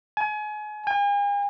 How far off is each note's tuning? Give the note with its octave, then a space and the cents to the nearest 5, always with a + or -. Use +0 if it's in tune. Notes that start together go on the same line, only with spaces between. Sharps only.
G#5 +30
G#5 -45